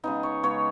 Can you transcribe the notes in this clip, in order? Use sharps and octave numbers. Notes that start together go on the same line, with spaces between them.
C#3 G#3 B3 D#4
C#5
C#3 G#3 B3 C#5